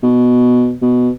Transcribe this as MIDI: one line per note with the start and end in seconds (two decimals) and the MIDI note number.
0.03 0.74 47
0.82 1.10 47